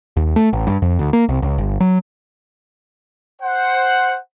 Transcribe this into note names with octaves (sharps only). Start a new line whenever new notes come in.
D#2
A3
A1
G2
F2
D2
A#3
C2
C#2
G1
F#3
C5 F#5